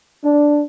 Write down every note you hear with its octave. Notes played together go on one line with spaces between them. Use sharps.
D4